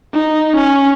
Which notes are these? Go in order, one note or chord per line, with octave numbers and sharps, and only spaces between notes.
D#4
C#4